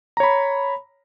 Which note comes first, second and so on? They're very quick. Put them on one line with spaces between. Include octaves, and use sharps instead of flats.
A#5 C#5 B5